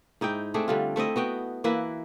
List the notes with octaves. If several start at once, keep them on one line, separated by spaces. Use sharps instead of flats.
G#2 D#4 E4 G5
A3 C4 D4 G#4
D3 G3 F4
A3 C4 E4 D#5
B3 F#4 G5
E3 A#3 E4 B4